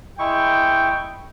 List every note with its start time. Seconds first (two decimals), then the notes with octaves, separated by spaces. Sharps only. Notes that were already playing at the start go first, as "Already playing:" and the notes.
0.19 G#3 E4 G5 C#6